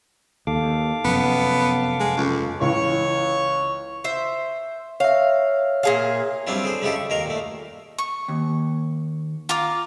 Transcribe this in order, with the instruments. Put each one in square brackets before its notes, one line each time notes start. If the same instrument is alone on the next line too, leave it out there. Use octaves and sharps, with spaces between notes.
[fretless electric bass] D#2 [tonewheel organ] A4 F5 D6
[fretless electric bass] F1 F#2 [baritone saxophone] B3
[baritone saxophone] G#3
C#2
[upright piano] C#2 E3 [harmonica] C#5 C#6
[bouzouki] C5 E5
[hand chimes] C#5 E5 [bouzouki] F5
[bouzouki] A#2 G#4 F5
[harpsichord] F#3 G3 C4 D4 E4 F4
D3 G#4 C5
C#3 G#3 E4 F4 G4 A4
C#6
D#2 D#3 A#4 F5
A#2 A3
[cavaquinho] C#6
[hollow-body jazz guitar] D#2
[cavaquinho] F4 A#5 D6